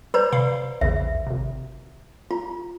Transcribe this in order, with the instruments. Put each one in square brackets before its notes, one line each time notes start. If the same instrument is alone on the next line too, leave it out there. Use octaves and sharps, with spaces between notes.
[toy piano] B4 C5 D5 [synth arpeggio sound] A#5 G6
[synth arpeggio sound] C3 F5 B5
[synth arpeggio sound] A#1 E2 C#3 [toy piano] E5
[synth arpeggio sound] G#1 C3
[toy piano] F4 [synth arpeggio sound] A#5